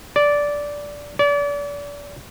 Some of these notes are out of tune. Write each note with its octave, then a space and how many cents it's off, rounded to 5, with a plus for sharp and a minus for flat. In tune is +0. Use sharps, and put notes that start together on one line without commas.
D5 -10
D5 -35